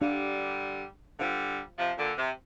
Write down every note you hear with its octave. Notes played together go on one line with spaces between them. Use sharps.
D3 G3 D4 G4 D5 F5
D3 G3 F4 C5 F5
C3 F3
A#2 D3
C3